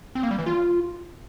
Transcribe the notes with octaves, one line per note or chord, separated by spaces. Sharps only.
C4
A#3
G3
E3
F4